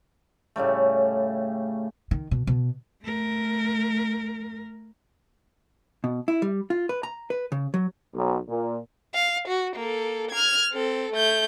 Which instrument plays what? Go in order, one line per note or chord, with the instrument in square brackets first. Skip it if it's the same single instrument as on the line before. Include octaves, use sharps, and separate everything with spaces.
[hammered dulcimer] A2 C#3 G3 A3
[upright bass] D#3
B2
B2
[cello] A3 A#4
[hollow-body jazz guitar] B2
E4
G3
F4
B4
A#5
B4
C#3
F#3
[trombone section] B1
A#2
[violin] F5
F#4
A#3 A4
F6 G#6
C4 A4
A3 G6